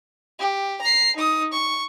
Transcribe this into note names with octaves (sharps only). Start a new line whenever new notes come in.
G4
A#5 C7
D#4 D#6
C#6